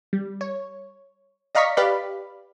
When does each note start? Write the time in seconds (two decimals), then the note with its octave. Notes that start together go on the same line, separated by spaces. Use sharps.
0.13 G3
0.41 C#5
1.55 D5 D#5 F5 A#5 C#6 B6
1.77 G4 B4 D5 F5 B5